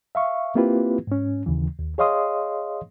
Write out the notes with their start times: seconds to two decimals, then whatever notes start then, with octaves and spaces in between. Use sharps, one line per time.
0.15 E5 F5 C#6
0.55 A#3 C4 E4 F4 G4 B4
1.07 G#2 C#4
1.46 D#2 C#3 E3
1.79 D#2
1.98 G#4 C#5 D#5 F5 C6 D#6